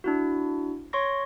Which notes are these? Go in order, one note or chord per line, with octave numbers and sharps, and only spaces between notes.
D4 E4 F#4
C#5 C6 C#6 A#6